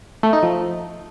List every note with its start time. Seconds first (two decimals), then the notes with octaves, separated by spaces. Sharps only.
0.23 A3
0.33 D#4
0.43 F3